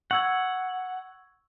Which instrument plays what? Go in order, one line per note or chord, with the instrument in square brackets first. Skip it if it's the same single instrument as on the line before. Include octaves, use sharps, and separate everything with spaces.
[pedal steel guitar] F#5 [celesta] C#6 E6 G#6